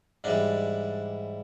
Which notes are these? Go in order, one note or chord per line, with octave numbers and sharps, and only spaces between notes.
G#2 E3 G3 D4